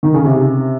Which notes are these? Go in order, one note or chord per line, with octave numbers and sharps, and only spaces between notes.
D#3
C#3
C3